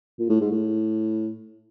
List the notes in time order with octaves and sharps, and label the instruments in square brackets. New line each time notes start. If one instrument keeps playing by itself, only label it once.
[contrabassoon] A#2
A2
G#2
A2